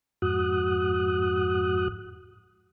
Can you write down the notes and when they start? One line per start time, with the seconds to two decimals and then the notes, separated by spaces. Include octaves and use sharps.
0.22 F2 G#2 F#4 D#6 F#6